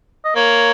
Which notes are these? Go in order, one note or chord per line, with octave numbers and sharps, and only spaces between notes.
D#5
A#3 C#5